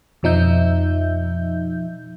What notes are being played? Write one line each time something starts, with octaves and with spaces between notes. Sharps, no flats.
F2 B2 F3 D#4 E5 G6